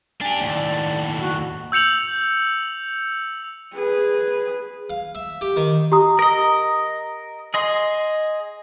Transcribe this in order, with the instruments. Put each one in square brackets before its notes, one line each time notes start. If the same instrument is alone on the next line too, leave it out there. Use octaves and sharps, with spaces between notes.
[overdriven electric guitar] D4 G4 [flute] G#5
[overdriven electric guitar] D#2 A2 [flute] D5
[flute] F#4
[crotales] E6 G6 C#7 F7 F#7
[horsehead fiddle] G#4 B4
[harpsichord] F5
E5
G4
D#3
[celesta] G4 A#5 D#6
[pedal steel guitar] A#4 D#5
G#4 D#5 C6